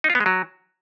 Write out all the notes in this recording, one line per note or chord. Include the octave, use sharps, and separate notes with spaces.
D#4
F4
B3
G#3
F#3